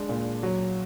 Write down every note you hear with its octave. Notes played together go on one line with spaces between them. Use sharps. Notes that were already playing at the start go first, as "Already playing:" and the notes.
Already playing: G#3 D4
A#2
F#3